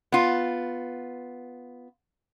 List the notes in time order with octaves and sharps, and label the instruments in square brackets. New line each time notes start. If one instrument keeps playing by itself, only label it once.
[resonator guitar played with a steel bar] B3 F4